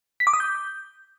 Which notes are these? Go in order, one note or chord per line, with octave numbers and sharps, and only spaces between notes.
B6
D6
D#6
G6